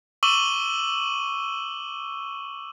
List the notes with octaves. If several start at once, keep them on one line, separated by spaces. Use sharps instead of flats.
C#6 D6 E6 D#7 F#7 G7